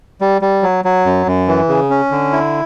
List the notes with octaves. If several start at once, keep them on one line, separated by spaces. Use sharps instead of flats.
G3
G3
F#3
F#3
F#2
F#2
E3
C#3
C#4
D3
E4